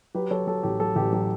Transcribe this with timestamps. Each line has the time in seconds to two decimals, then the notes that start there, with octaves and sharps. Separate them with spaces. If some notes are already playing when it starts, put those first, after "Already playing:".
0.15 F#3 G4 B4
0.31 F#3 A4 C#5
0.47 F#3 A4
0.63 A1 G4
0.80 F#3 A4
0.96 A1 G4
1.13 F#3 G4